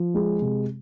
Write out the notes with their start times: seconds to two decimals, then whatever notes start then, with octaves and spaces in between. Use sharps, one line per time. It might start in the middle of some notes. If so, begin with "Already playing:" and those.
Already playing: F3
0.14 G#3
0.41 C3